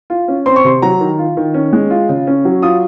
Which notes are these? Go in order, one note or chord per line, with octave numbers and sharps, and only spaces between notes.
F4
C#4
C4 C6
C#6
C3 C6
F#3 A#5
D#3
F4
D#3
C#4
G#3
F4
C#3
C#4
F#3
F4 D#6